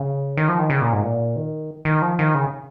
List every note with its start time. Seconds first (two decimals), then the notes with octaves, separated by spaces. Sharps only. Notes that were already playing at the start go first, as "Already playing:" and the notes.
Already playing: C#3
0.37 D#3
0.49 F3
0.59 D#3
0.70 C#3
0.82 A#2
0.93 G#2
1.03 A#2
1.36 D#3
1.85 D#3
2.02 F3
2.19 D#3
2.35 C#3